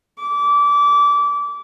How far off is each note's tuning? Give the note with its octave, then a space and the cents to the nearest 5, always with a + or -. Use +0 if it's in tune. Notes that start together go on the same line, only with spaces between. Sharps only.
D6 -25